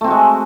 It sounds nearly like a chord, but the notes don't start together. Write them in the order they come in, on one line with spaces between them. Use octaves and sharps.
A3 C4 F#4 G#3